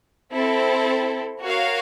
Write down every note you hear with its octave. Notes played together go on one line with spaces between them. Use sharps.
C4 E4 A4
F#4 A#4 C#5 F5